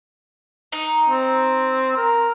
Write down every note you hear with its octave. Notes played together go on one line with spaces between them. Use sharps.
D#4
C4
A#4